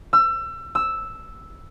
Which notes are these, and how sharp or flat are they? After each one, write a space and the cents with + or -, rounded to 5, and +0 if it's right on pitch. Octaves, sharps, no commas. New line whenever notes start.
E6 +30
E6 +0